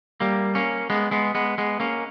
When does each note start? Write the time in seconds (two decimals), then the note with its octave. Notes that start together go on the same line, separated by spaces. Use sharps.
0.21 G3 A#3
0.55 A#3 C#4
0.90 G#3 B3
1.11 G#3 B3
1.35 G#3 B3
1.58 G#3 B3
1.80 A#3 C#4